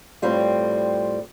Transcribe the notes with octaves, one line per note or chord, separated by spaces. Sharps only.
A2 G3 C4 F4